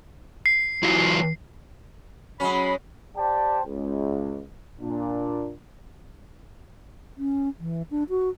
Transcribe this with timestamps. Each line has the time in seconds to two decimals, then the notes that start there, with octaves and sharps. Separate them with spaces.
0.46 C7
0.83 E3 F#3
2.40 F#3 G#3 C#4 B5
3.17 G4 C5 D5 G5 A5
3.65 C#2
4.80 A#2 D4
7.18 C#4
7.59 E3
7.91 D4
8.10 F#4